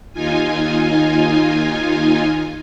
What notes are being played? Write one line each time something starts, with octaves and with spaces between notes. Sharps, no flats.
D#2 D#4 F4 G#5